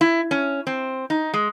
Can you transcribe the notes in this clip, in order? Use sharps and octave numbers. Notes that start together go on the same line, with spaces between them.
E4
C#4
C4
D#4
G#3